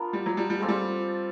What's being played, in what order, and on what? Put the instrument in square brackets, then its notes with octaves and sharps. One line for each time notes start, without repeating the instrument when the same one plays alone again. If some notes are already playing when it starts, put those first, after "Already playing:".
Already playing: [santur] B3 D4 F4 A#4
[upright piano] G3
F#3
G3
G3
[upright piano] G#3 [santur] C4 F4 A4 D5
[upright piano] G3